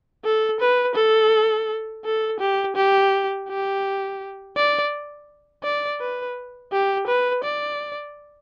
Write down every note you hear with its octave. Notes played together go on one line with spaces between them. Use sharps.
A4
B4
A4
A4
G4
G4
G4
D5
D5
B4
G4
B4
D5